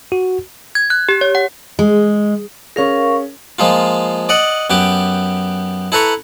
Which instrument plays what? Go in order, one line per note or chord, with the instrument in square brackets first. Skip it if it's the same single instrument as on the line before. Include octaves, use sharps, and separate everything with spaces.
[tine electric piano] F#4
[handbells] G#6
F#6
G4
C#5
F#5
[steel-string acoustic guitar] G#3
[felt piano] C#4 G#4 [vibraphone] A#4 F5 C#6
[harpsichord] F3 G#3 A#3 F4
D5 D#5 F#5
F#2 B3 G4 D6
E4 A4 B4 A#5 C#6